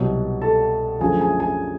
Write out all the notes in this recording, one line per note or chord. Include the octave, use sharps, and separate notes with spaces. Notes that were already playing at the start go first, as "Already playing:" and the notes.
Already playing: C2 B2 F#3
A4 A5
F#2 D3 F3 A3 G#4 G#5
G#4 G#5
G#4 G#5